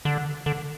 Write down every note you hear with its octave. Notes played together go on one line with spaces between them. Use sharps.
D3
D3